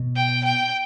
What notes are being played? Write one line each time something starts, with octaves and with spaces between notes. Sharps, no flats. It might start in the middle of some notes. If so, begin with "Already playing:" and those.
Already playing: B2
G5
G5